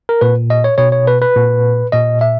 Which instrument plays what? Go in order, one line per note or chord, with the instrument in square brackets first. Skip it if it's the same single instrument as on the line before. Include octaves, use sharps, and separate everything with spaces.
[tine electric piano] A#4
A#2 B4
D#5
C#5
B2 C#5
C#5
B4
B4
A#2
A#2 D#5
E5